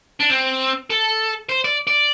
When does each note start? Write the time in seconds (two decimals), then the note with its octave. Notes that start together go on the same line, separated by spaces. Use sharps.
0.20 D4
0.30 C4
0.90 A4
1.49 C5
1.64 D5
1.87 D5